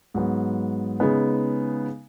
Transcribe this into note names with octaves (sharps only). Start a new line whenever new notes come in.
G#2 F#3 B3
C#3 G#3 B3 D#4